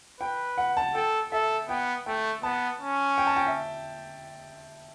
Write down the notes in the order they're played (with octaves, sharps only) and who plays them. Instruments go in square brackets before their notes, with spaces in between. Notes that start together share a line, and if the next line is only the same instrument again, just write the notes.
[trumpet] B4 [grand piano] G5
[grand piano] F#5
A5
[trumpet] A4 [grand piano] G5
[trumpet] A4 [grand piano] E5
[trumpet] B3 [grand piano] G5
[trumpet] A3 [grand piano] G5
[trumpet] B3 [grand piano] A5
[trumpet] C#4
[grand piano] G5
A5
G5
E5